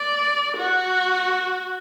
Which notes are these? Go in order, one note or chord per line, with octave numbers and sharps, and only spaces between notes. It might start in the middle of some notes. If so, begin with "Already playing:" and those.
Already playing: D5
F#4